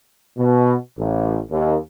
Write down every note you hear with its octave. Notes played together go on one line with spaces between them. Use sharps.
B2
A1
D#2